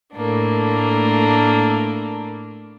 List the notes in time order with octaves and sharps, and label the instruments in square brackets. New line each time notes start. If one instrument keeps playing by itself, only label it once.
[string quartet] A2 A3 A#3 D4